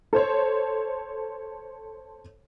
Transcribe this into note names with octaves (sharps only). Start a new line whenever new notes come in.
A4 C5 C#5